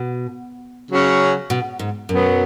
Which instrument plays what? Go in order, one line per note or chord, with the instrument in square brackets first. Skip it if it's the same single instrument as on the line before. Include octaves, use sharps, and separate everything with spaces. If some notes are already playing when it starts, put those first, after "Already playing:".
Already playing: [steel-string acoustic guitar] B2
[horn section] C#3 F#3 C#4 F#4
[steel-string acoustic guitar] B2
G#2
[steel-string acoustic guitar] F#2 [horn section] B2 F#3 B3